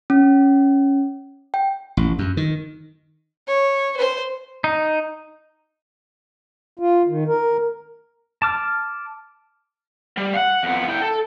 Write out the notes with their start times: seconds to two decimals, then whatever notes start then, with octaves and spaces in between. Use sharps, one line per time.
0.10 C#4
1.54 G5
1.97 A1
2.19 F#2
2.37 D#3
3.47 C#5
3.97 C5
4.64 D#4
6.79 F4
7.08 D#3
7.28 A#4
8.42 A5 D6 F6
10.17 G3
10.34 F5 F#5
10.63 F2 B3
10.88 E4 G5
11.01 A4